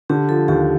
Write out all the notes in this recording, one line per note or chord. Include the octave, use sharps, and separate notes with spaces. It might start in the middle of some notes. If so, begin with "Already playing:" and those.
D3 G4
F3 A4
D#2 G4